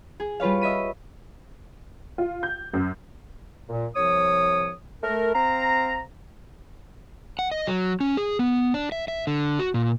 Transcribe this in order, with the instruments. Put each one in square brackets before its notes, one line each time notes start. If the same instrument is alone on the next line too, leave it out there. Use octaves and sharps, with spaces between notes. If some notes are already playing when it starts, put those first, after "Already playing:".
[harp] G#4
G3 F4 B4 C#5 F5
D#5 E5 B6 D#7
[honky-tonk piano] F4
G6
F#2
[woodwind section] A#2
C2 F3 C#5 D#6
A3 A#4
C4 F5 A#5
[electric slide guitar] F#5
D#5
F#3
C#4
G#4
B3
D4
E5
E5
D3
F#4
A#2